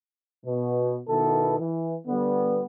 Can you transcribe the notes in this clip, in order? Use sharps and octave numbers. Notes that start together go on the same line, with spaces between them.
B2
B2 D#3 B3 E4 A4
E3
D3 G3 B3